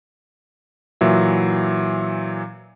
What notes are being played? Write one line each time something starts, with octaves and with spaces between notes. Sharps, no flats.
A#2 E3 F#3 E5